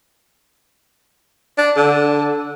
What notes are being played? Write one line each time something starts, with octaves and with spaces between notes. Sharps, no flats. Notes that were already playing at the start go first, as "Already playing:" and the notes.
D4
D3